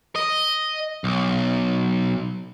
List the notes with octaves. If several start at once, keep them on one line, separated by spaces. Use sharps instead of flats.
D#5
B1